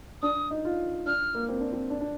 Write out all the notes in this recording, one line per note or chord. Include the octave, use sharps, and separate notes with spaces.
D4 D#6
D#4
F4
D4 F6
A#3
C4
D4
C4
D4
D4